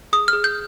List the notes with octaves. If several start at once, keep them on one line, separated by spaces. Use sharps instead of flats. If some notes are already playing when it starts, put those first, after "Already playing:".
G#4 D#6
F6
G#4
G6